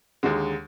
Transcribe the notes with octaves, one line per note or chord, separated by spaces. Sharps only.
D#2 D3 G#3 F#4